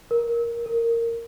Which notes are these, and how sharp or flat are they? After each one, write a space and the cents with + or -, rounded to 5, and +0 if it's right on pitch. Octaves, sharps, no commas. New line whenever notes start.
A#4 +10
A#4 -15